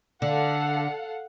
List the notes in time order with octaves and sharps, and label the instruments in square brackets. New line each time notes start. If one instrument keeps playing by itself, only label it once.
[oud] D3 [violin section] A4 F5 F#5